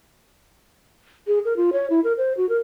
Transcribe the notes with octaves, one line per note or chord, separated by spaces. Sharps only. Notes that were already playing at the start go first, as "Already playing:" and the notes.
G#4
A#4
F4
C#5
E4
A#4
C5
F#4
A#4